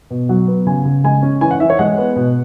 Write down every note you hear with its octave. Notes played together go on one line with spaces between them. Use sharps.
B2
F#3 F#5
B3
C#3 G#5
C#3
G#3 G#5
C#4
E3 G#5
F#5
E3 E5
C#5
G#3 F#5
B3
B2